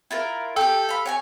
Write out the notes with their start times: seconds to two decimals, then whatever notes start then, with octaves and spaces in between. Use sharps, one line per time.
0.11 E4 F4 A#4
0.57 G4 A4 G5
0.89 F5 B5
1.06 C#5 G5 G#5